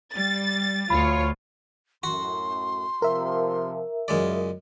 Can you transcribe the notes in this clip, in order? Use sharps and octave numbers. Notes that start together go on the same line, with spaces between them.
G3 A6
D2 F4 C#5 B5
F#2 A2 F#4 C6
C3 F3 A#4 E5
F#2 C#3 G#3 F4 G#4 D5